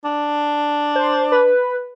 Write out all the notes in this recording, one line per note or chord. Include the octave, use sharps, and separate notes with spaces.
D4
C5
B4